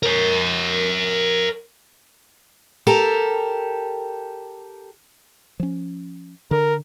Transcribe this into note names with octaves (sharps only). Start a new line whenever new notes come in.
A#4 C#5
G4 A4 A#4
F3 C#4
D3 A#4